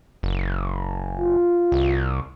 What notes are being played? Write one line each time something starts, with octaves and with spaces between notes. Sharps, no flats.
F#1
F4
C2